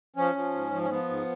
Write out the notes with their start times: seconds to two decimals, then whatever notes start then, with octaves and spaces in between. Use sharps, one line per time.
0.16 F3 C#4
0.35 F3
0.53 G#2
0.72 F3
0.83 C#4
0.90 F3 B3
1.08 G#2